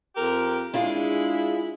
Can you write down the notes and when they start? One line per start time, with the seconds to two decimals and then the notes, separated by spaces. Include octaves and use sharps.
0.16 F2 G4 A#4
0.74 G#3 D4 E4 F4 G#4